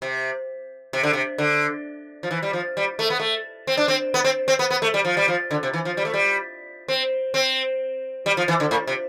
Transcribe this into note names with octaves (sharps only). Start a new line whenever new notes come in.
C3
C3
D3
C3
D3
F3
E3
G3
F3
G3
A3
B3
A3
C4
D4
C4
B3
C4
C4
B3
B3
A3
G3
F3
G3
F3
D3
C3
E3
F3
G3
A3
G3
C4
C4
G3
F3
E3
D3
A2
C3